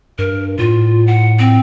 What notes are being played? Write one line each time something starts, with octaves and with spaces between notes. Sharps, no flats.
G2 A#4
A2 F4
F#5
C4